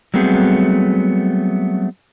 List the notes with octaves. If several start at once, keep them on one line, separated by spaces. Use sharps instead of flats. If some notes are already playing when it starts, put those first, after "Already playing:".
F#3 G3 A3 B3 C4 G#4